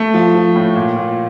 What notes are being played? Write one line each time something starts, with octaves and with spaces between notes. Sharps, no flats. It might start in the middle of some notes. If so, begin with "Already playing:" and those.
Already playing: A3
F3
F3
A2
A#2
A#2